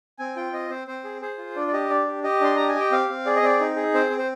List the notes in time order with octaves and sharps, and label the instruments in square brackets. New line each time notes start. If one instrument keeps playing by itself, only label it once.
[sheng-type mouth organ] C4 G#5
F4 G5
C4 D#5
C4 C5
C4 C5
G#4
G#4 C5
F4
D4 D5
D5
G4 D#5
D4 D5
G4
G4 D#5
D4 C6
G4 A#5
G#5
G4
G5
C4 F5
C4
G#4 D5
D#5
C4 D5
D#4
G#4
C4 C5
C4
C5